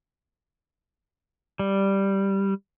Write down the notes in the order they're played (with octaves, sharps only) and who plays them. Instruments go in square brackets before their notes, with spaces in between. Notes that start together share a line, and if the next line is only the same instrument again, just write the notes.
[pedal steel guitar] G3